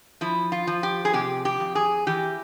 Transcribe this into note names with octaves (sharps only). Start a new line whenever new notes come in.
F3 E4
F4
F3
G4
G#4
C3 G4
G4
F2
G#4
E3 G4